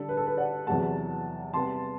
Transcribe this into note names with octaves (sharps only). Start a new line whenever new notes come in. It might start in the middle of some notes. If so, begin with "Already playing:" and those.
Already playing: D3 G3 D4 A4
B4
A4
B4
D5 F#5
E2 C3 F#3 B3 F#5 A5
C3 G3 B3 A5 C6